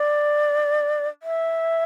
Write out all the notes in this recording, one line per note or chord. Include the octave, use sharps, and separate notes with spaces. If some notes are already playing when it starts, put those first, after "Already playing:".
Already playing: D5
E5